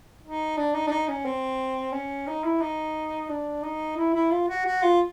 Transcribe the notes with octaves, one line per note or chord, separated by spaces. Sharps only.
D#4
D4
D#4
D4
D#4
C#4
C4
C#4
D#4
E4
D#4
D4
D#4
E4
E4
F4
F#4
F#4
F4